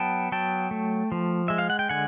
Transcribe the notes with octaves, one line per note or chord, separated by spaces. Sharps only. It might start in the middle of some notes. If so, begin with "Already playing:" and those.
Already playing: F#3 B3 G5 A5
F#3 G5 A5
A3
F3
G#3 E5
F5
F#5
G5
D3 F#5 G#5